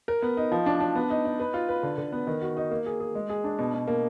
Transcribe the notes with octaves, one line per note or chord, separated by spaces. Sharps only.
A#4
B3
D#4
F3
D4
D4
B3
D#4
D#4
B4
F4
B4
D3
D3
B3
D#3
F#4
D#4
A#3
G#4
G#4
G#3
G#4
D4
B2
B2
A#3